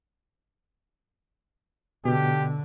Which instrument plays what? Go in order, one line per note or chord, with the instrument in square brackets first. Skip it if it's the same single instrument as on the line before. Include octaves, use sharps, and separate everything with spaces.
[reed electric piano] B2 [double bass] D3 [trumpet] G4